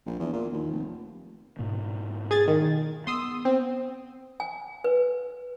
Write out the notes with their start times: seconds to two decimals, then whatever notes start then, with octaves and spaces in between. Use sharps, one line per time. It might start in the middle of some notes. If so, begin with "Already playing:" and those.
0.06 A#1
0.20 E2
0.33 A#2
0.52 D#2
0.70 F1
1.59 G#2 B2 A#3
2.31 G#4 G#6 A6
2.48 D#3
3.07 B3 C6 D#6 E6
3.45 C4
4.40 G#5
4.84 B4